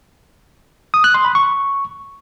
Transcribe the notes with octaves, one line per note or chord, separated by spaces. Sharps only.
D#6
F#6
C6
B5
C#6